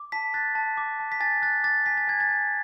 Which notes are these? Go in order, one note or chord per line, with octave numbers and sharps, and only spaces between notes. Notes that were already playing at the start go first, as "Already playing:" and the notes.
Already playing: D6
A5 B6
F#6 A6
A5
D6
A5
B6
G#5 A6
F#6 A6
D6 A6
G#5 B6
A6
G#5 G#6
A6
G#5